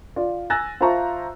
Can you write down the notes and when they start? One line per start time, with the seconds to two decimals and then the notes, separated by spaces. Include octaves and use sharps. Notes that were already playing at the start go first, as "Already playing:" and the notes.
0.16 F4 D5
0.50 G#5 E6 F#6 A6 A#6
0.81 F4 C5 E5 A5 A#5 C#6